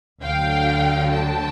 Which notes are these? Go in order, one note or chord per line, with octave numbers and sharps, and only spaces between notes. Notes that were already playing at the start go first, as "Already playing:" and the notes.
D2 D3 F#3 F5 G5
G5 A5